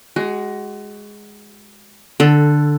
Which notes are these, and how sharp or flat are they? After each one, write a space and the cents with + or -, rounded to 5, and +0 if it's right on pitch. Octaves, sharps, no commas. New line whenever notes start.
G#3 +0 F#4 +25
D3 +10 A4 +0